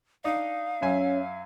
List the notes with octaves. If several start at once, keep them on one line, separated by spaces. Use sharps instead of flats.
D4 D#4 F5
F#2 C#4 E5 G#5